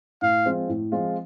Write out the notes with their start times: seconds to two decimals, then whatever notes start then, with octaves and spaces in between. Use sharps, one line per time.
0.22 A2 F5
0.45 F3 G#3 C4 F4
0.69 A2
0.92 F3 G#3 C4 F4